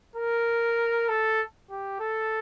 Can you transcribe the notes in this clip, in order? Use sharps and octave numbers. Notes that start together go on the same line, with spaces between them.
A#4
A4
G4
A4